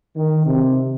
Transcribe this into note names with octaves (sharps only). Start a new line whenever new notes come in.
D#3
C3